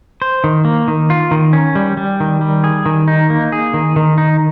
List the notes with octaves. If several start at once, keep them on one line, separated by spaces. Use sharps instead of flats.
C5
D#3
A#3
D#3
F4
D#3
C#4
G3
G3
D#3
G3
G#4
D#3
D#4
A#3
G#4
D#3
D#3
D#4